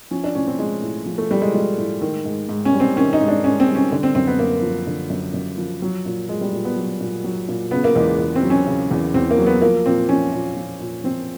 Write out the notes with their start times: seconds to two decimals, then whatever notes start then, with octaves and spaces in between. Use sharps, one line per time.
0.11 F3 C#4
0.24 D4
0.35 A2 C#4
0.47 C4
0.59 F3 G#3
0.82 A2
1.06 F3
1.18 A3
1.30 A2 G3
1.42 G#3
1.53 F3 G#3
1.77 A2
2.01 D#3
2.25 G#2
2.49 G#2
2.65 C#4
2.73 G3
2.80 C4
2.96 D#3 C#4
3.13 D#4
3.21 G#2
3.28 D4
3.44 G#2 C#4
3.60 C4
3.68 G3
3.75 C#4
3.92 D3
4.03 C4
4.15 F#2 C4
4.27 B3
4.39 F#2 A#3
4.62 F3
4.87 D3
5.10 F#2
5.34 F#2
5.58 F3
5.82 F#3
6.06 A#2
6.29 F#3 G#3
6.41 G3
6.52 A#2
6.65 B3
6.77 F#3
7.01 A#2
7.24 F#3
7.48 A#2
7.71 C#3 B3
7.84 A#3
7.96 E2 G#3
8.19 E2
8.36 C4
8.43 F#3
8.50 C#4
8.67 C#3
8.91 E2
9.14 E2 C4
9.31 A#3
9.38 F#3
9.46 B3
9.62 F3 A#3
9.86 A#2 C4
10.09 F3 C#4
10.33 A#2
10.57 F3
10.80 A#2
11.04 F3 C4